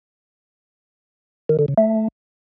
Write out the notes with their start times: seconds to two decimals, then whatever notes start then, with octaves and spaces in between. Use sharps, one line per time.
1.49 D#3
1.59 D3
1.68 C#3
1.78 A3